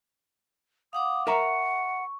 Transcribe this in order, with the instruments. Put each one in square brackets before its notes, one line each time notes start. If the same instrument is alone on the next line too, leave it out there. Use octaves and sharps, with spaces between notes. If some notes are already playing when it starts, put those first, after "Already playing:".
[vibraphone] F5 F#5 D6 [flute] D#6
[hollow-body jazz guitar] A#4 E5 A#5 [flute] F#5 [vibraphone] C#6